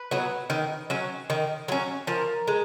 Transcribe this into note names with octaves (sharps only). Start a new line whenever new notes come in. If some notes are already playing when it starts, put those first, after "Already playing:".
Already playing: B4
F#3 B3
D#3
F#3 C#4
D#3
F#3 C#4
F3 A#4
G#3